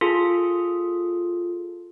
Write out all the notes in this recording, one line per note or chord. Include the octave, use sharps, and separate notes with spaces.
F4 G#4 A4